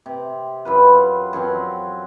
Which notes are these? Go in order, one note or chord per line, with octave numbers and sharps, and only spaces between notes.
C3
F#2 F4 B4
F#2 F3 C4 C6